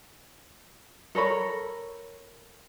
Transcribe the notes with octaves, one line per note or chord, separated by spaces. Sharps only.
A4 A#4 C#5 B5